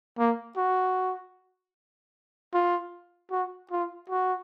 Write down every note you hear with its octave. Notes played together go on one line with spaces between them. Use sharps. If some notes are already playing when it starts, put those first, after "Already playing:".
A#3
F#4
F4
F#4
F4
F#4